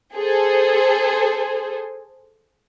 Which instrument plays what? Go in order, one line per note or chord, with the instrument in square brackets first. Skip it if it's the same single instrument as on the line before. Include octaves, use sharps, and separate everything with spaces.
[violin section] G#4 A4 C5